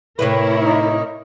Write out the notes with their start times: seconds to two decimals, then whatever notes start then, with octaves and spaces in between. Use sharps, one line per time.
0.19 A2 C3 E4 A#4 B4 C#5
0.63 D#4